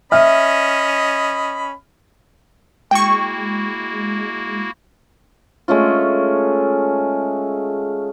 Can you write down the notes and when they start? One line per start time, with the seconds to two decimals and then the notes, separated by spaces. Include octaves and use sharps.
0.12 C#4 D#5 E5 B5 F6
2.91 G#3 A#3 E4 F#4 G5 C#6
5.68 G#3 A3 C#4 F4